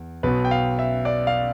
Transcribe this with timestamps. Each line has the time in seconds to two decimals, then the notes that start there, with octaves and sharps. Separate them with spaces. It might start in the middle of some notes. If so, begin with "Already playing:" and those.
Already playing: E2
0.23 B1 B2 B4
0.45 G5
0.51 F5
0.79 E5
1.05 D5
1.27 F5